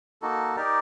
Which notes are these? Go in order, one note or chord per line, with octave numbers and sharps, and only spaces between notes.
A#3 D#4 F#4 A4
D#4 G4 A#4 D5